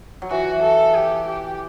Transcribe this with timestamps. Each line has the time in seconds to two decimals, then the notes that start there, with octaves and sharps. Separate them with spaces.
0.22 F#3
0.31 E3 F#4
0.62 A4
0.95 G4
1.26 G4